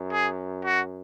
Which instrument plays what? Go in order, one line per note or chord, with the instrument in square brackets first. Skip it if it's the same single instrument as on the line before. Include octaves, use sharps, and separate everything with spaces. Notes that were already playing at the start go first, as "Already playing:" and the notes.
Already playing: [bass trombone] F#2
[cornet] G#4
F#4